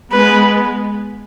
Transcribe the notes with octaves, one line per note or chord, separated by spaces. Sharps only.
G#3 B3 B4